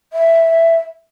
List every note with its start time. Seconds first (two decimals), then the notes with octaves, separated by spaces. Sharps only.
0.13 E5